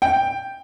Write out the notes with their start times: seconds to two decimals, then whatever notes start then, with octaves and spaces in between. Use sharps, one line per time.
0.02 G5